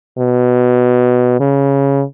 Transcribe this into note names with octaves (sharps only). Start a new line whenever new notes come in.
B2
C#3